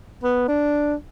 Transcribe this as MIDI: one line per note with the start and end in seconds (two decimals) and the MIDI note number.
0.24 0.47 59
0.48 0.94 62